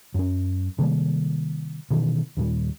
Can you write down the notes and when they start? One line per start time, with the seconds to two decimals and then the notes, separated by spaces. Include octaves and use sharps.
0.14 F#2 C#4
0.78 C3 D#3 G3 A#3
1.91 B2 D#3 E3
2.37 D#2 A#2 G3